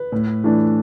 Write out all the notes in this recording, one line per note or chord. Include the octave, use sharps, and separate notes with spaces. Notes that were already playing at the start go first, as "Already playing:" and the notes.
Already playing: B4
A2
E3 A3 D4